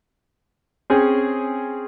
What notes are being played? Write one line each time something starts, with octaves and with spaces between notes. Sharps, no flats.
C4 C#4 G#4